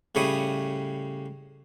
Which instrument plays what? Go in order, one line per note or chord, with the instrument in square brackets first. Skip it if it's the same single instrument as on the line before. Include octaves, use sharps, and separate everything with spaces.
[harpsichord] A2 C#3 G3 C#5 B5 D#6